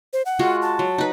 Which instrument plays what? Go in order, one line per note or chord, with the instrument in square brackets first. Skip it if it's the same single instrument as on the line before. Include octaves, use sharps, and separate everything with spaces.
[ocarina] C5
F#5
[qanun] G#3 F4 F#4
[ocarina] A5
[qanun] F#3
D#4 B4